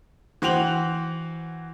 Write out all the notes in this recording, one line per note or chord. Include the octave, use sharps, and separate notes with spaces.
E3 F#4 C5 G5 F7 F#7